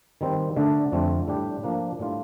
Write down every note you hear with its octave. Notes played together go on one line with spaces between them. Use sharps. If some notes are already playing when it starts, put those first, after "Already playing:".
D#3 G3 C4
D3 A3 D4
F2 D3 A3 C4
A2 G3 D4 G4
F3 A#3 D4
A2 G3 D4 F4